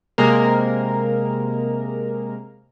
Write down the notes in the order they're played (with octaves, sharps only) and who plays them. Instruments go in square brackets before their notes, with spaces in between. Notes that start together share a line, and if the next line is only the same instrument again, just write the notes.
[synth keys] C3 G#3 A#3 A#4